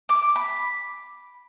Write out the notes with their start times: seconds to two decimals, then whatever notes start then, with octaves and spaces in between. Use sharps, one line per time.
0.09 D6
0.36 B5